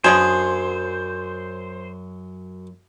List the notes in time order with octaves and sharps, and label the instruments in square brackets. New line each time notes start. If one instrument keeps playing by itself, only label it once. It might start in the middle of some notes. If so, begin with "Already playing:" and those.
[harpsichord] F#2 [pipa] D3 B3 G#4 [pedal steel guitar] C5